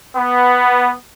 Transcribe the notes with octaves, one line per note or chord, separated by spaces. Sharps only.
B3